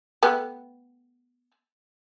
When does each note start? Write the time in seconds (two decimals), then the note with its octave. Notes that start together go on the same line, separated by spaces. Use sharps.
0.23 A3 B3 G4